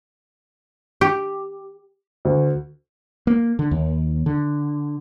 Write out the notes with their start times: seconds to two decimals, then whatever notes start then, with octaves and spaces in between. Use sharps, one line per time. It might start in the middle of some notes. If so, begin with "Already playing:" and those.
1.01 G4
2.25 D2
3.27 A#3
3.59 D3
3.71 D#2
4.26 D3